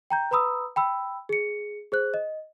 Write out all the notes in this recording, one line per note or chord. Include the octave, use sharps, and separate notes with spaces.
G5 A#5 G6
B4 A#5 B5 D#6 E6
G5 B5 E6
G#4 C#7
G#4 C5 F#6
D#5